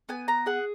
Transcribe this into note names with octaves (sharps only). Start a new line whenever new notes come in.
B3 G#5
A#5
G#4 F#5